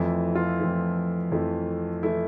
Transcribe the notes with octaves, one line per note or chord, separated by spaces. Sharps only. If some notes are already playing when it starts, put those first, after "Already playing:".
Already playing: F2 E3 A3 E4
F4
F2 E3 A3
F2 E3 A3
E3 A3 E4